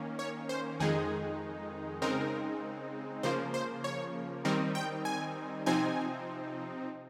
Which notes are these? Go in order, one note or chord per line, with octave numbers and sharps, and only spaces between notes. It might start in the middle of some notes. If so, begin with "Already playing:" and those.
Already playing: D#3 A#3 C#4
C#5
C5
F2 D#3 G#3 D#4 G#4
C#3 G#3 C4 D#4 A#4
C#3 F3 A#3 C5
C5
C#5
D#3 G3 C4 D#4 A#4
G5
G#5
C3 F3 C4 D#4 G#5